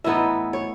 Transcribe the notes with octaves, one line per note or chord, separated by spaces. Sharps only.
A2 E3 B3 D#4 E5
C#5